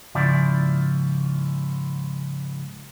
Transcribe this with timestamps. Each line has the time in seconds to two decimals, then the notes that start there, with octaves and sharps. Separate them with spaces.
0.15 G#2 C#3 F3 E4 D5